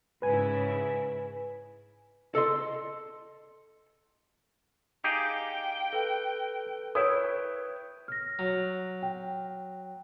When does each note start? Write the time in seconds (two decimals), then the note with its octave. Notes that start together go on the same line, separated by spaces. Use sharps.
0.22 G#2 C#3 E4 B4 G#5
2.35 A4 D#5 C6
5.04 D#4 G4 G#4 F5 G5 D6 C#7
5.93 A4 B4
6.95 E4 B4 C#5 G5 D#6 G6
8.08 F6 A#6
8.39 F#3
9.03 G5